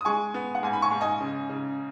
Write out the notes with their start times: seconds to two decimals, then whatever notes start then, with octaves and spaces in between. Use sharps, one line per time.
0.01 D#6
0.05 G#3 G#5 C#6
0.34 B3
0.55 F#5
0.63 G#2 G#5
0.73 B5
0.82 G#5 C#6
0.92 G#2
1.01 D#5 G#5
1.20 C#3
1.49 C#3